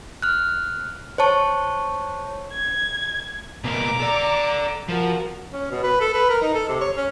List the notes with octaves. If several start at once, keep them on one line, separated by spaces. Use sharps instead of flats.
F6 F#6
C5 C#5 A5 C#6
G#6
B2 A#3 A#5 D6
A4 D5
F3 F#4 A#4
C#4
B2
B4
A4
B4
A#4
D#4
A4
C3
C#5
C#4